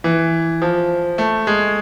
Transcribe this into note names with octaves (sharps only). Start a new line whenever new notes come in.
E3
F3
A3
G#3